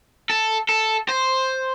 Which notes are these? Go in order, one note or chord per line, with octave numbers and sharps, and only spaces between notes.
A4
A4
C5